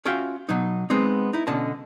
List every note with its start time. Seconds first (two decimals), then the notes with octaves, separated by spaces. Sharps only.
0.05 C#4 F4 F#4 E5 F5 G5
0.49 B2 F#3 D#4
0.90 G#3 B3 C4 D#4
1.33 D#4 E4
1.47 B2 D3 C#4 D#5 A5